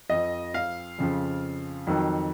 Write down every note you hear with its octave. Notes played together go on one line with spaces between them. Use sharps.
F2 F3 D#5
F5
F2 C#3 F3
F2 D#3 F#3